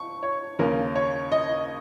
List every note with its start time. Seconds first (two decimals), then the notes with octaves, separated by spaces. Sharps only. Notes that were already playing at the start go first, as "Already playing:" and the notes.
Already playing: C#6
0.23 C#5
0.59 D#2 C#3 A#3 C#4 A#4
0.95 C#5
1.32 D#5